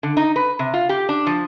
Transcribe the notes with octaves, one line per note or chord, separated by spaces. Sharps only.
D3
D#4
B4
C3
F4
G4
D4
F3